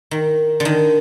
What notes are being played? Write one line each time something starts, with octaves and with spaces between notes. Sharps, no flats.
D#3
D3
D#3